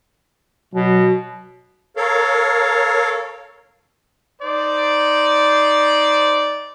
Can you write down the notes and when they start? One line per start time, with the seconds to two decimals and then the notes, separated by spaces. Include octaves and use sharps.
0.74 B2 F#3
1.97 A4 A#4 C#5 F5
4.41 D#4 C5 D5